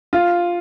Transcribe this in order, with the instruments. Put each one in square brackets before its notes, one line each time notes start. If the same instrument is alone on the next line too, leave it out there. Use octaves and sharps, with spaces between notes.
[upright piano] F4